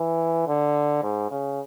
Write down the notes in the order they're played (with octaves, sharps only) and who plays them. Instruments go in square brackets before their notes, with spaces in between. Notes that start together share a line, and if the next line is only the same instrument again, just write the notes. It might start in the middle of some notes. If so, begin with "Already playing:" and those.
Already playing: [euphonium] E3
D3
G#2
C#3